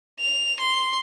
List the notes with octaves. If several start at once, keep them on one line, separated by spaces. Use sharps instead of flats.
F7
C6